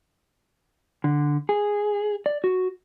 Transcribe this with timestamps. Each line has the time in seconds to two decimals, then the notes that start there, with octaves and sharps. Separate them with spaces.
1.04 D3
1.49 G#4
2.26 D5
2.44 F#4